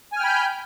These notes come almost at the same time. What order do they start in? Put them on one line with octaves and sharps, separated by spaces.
G#5 F6 G5 B5 G6